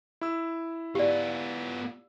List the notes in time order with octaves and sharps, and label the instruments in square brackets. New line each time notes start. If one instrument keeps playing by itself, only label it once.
[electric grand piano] E4 E6
[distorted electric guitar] B3 F4 [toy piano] G4 D5